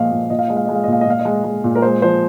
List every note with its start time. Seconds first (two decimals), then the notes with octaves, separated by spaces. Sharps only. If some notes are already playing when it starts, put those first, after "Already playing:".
Already playing: A#2 F3 G#3 D#5 F5
0.11 A#2
0.30 A#2 D#5
0.39 F5
0.48 G#3 D#5
0.57 F5
0.65 G#3 D#5
0.75 F5
0.84 A#2 D#5
0.93 F5
1.01 D#5
1.06 A#2 F5
1.19 D#5
1.25 G#3
1.44 G#3
1.64 A#2
1.75 A#4
1.82 G#3 C5
2.02 F3 C5